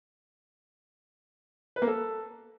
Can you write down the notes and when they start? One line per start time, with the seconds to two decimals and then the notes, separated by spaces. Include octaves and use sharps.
1.76 B4
1.82 A#3
1.88 A4